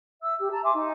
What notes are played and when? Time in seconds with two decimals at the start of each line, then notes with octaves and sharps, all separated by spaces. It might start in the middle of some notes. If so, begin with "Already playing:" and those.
0.21 E5 E6
0.37 G4
0.50 A5 A#5
0.62 E5 G#5 C6 D6
0.74 D#4